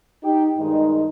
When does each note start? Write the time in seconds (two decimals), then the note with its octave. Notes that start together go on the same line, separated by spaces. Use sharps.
0.23 D#4 G4
0.57 G2 D#3 G#3 D#4